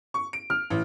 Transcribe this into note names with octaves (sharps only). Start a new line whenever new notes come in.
C#6
D7
F6
A1